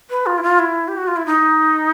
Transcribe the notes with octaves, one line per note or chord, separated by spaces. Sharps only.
B4
F4
E4
F4
E4
G4
F#4
F4
E4
D#4